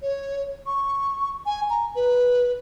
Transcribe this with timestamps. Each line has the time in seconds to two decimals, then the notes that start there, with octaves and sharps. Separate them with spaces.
0.02 C#5
0.66 C#6
1.46 G#5
1.70 A#5
1.96 B4